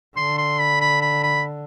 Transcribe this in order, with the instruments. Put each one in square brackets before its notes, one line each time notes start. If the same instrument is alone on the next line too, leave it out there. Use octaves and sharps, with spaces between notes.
[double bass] D3 [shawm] C6
[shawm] C6
B5
B5
B5
B5